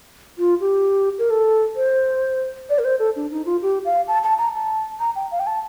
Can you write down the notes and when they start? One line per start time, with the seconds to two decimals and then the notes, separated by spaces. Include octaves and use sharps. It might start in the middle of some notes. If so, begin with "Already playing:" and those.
0.38 F4
0.60 G4
1.19 A#4
1.30 A4
1.76 C5
2.70 D5
2.79 A#4
2.85 C5
2.99 A4
3.16 D4
3.31 D#4
3.46 F4
3.62 G4
3.85 F5
4.08 A5
4.23 A5
4.38 A#5
4.54 A5
5.00 A#5
5.16 G5
5.31 F5
5.40 G5
5.47 A5